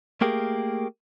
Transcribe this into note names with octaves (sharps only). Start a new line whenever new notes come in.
A3 A#3 G4 G#4 A#4